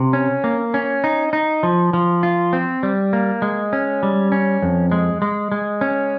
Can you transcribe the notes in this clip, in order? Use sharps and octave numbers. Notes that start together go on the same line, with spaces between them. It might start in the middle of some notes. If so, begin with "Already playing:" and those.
Already playing: C3
C#4
A#3
C#4
D#4
D#4
F3
F3
F4
C4
G3
A#3
G#3
C#4
G3
C#4
F2
G#3
G#3
G#3
C#4